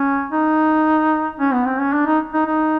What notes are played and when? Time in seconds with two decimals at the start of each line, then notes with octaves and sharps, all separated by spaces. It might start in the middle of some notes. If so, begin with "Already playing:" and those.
Already playing: C#4
0.32 D#4
1.39 C#4
1.53 B3
1.66 C4
1.79 C#4
1.93 D4
2.06 D#4
2.33 D#4
2.46 D#4